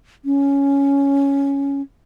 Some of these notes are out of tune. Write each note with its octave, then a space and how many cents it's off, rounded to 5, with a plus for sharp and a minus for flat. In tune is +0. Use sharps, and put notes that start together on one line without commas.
C#4 +5